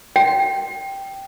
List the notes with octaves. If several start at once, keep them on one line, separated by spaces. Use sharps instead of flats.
G5